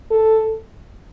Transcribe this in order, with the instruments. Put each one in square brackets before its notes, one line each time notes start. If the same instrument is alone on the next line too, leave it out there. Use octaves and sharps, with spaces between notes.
[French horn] A4